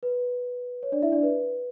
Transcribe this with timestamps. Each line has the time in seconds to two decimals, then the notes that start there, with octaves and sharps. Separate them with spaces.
0.03 B4
0.83 C#5
0.92 D4 D5
1.02 E4 E5
1.12 D4 D5
1.23 B4